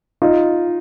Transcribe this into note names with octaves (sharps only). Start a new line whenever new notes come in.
D#4 F4